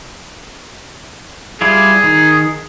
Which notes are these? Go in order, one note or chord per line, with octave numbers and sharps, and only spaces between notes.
G3 E4 F4 G#4
D#3